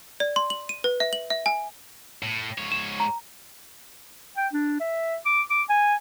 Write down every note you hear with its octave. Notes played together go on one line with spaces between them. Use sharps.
D5
C6
F#7
D#7
B4
E5
F#7
E5
G#5
A2
G#2 C#5
E7
A#5
G5
D4
E5
D6
D6
G#5